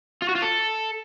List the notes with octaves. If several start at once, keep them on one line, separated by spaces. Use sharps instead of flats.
F4
F#4
F4
A4